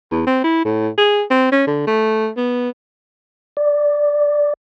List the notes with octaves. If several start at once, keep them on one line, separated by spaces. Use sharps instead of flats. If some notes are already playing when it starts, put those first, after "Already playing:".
E2
C4
E4
A2
G#4
C4
C#4
D3
A3
B3
D5